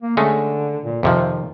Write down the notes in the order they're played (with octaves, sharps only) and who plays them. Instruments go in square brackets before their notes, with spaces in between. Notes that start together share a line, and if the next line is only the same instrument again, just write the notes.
[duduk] A#3
[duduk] D3 [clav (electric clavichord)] G#3 A3 C#4
[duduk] A#2
[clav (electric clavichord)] F2 C3 F3 [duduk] D#3